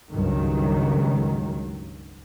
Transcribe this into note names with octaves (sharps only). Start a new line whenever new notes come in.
C#2 G2 D#3 F#3